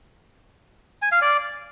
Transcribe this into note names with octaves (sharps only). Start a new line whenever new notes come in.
G#5
F5
D5